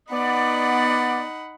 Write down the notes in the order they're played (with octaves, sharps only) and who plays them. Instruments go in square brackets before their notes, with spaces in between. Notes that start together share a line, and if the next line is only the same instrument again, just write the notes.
[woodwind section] B3 D5 [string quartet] D#4 F#5 B5